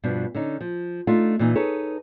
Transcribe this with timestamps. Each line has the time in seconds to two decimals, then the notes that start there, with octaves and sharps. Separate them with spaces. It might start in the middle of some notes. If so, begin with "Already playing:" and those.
0.04 G2 B2 F3 D4
0.35 D3 C#4 D#4
0.61 F3
1.07 A3 D4 D#4 F4
1.39 A#2 E3 D#4
1.55 D#4 G#4 A4 B4 C#5